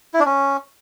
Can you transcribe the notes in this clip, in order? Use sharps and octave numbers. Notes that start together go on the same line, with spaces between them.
E4
D4
C#4